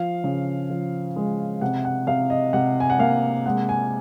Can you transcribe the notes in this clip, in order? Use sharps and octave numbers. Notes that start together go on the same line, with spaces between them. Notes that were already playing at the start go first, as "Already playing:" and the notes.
Already playing: F3 F5
C#3
F3
G#3
C3 F#5
F#5
C3 F5
D#5
C3 F#5
G#5
F#5
A#3 F5
G#3 F#5
G#5